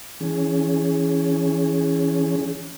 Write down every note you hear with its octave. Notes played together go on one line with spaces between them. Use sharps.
E3 C#4 G#4